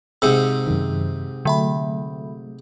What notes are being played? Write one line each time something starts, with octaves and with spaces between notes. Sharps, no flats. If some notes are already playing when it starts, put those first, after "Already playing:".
G#2 C3 G#4 E6
F#2 D#3
D3 F#3 A3 E5 B5